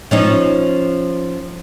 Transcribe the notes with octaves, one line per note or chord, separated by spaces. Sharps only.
F3 C#4 D#4